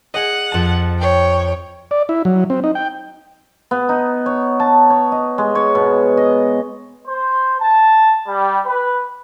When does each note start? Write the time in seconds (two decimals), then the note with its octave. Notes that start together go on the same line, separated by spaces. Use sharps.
0.14 G#4 D#5 F#5
0.52 F2 A5
0.99 C#5 G5
1.91 D5
2.09 E4
2.25 F#3
2.50 C4
2.64 D#4
2.75 G5
3.71 B3
3.89 D#4
4.26 C#5
4.60 A5
4.90 C#5
5.12 D#5
5.38 G#3
5.55 C#5
5.75 B2
6.17 D#5
7.08 C5
7.61 A5
8.27 G3
8.66 B4